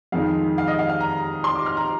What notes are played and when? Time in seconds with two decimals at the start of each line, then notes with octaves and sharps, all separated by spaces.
0.12 F2 D#3 G#3 D#4 F5
0.58 F5
0.68 D#5
0.79 F5
0.89 F5
1.01 A#5
1.44 C6
1.55 D6
1.66 F6
1.77 A#5